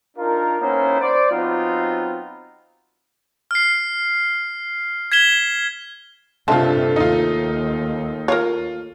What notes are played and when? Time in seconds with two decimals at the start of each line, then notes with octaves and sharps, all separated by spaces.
0.17 D4 D#4 F4 A#4
0.61 A#3 B3 C#4 D#4 E4 C5
1.00 C5 D5
1.30 F#3 B3 C4 D#4 F4
3.51 F6 C7
5.12 G#6 B6 E7 G7
6.48 G2 C3 G#3 A3 F4 D5 A5
6.96 D#2 D#4 F4
8.28 F4 A#4 C#5